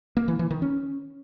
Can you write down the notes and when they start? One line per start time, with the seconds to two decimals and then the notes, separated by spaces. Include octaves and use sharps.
0.17 A#3
0.28 E3
0.39 E3
0.51 D#3
0.62 C#4